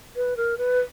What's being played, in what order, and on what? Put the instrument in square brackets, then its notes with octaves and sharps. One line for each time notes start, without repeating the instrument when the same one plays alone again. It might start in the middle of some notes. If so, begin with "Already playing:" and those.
[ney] B4
A#4
B4